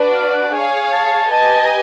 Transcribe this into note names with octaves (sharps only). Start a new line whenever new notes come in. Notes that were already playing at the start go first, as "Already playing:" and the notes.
Already playing: D4 F#4 B4 D5
F5
F#5
G#4 C#5 F5 G#5
A5
G4 B4 D#5 G#5 A5
A#5